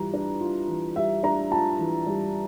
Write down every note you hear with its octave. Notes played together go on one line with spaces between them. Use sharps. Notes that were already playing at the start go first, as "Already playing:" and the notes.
Already playing: E3 G3 F4 A#5
D4
F4
E3
G3 E5
D4 A#5
F4 A5
E3
G3